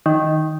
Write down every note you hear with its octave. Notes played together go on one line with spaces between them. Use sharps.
D#3